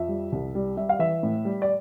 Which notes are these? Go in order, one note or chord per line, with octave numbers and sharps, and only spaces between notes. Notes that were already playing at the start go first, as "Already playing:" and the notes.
Already playing: F2 E5
G3
C2
G3
G3 E5
F5
E3 E5
A2
G3
D5